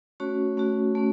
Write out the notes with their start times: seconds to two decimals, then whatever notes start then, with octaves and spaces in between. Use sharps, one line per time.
0.20 A3 C#4 F#4 C#5
0.57 A3 C#4 F#4
0.95 A3 C#4